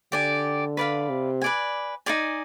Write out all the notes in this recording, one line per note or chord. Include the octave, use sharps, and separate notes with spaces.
D3 G4 D5 G#5
B4 D5 F5 B5
C3
B4 D5 G#5
D#4 G#4 D5 G#5